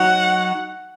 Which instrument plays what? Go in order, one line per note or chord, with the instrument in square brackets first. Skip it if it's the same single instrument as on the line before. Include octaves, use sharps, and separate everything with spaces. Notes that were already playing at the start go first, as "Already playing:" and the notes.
Already playing: [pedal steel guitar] F#3 D#4 F#4 C#5 [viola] F#5